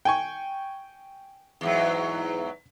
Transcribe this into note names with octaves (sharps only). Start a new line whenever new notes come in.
G5 G#5 C#6
E2 G#2 F#3